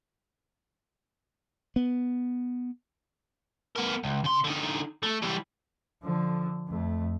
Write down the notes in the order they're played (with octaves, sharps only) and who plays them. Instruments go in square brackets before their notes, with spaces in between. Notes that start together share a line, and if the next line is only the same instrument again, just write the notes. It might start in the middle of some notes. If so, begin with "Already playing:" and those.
[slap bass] B3
[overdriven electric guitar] B3 A#4
C#2
C#3 C6
D3 D#4
A3
E3 G3
[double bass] D3 F3
F2 A3